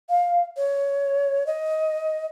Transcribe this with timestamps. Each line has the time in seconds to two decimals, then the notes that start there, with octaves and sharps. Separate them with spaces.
0.09 F5
0.57 C#5
1.47 D#5